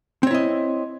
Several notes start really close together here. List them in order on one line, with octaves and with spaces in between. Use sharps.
C4 C#5 E4 D#5